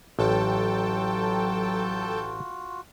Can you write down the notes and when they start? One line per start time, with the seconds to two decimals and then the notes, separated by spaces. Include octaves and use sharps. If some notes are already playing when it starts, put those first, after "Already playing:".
0.19 A1 F#3 F4 F#4 A4 G5 A5